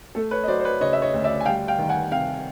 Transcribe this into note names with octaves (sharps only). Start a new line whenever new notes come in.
A3 A4
B4 C#5
D#5
F#3 C5 D5
C5
B4 C#5
C#3 C#5 D#5
E5
C#5 D#5
D2
D5 E5
G#5
G3 F5 G5
F5 G5
D#3
F#5 G#5
C3 F5 G5